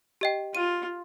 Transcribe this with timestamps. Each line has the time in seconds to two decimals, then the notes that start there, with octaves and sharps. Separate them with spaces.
0.21 G4 D#5 G5
0.55 F4 D#7